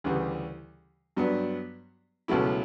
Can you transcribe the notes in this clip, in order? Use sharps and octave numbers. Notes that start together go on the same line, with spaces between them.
D2 C#3 E3 G3
G2 F#3 B3 D4
C#2 B2 F#3 A3 E4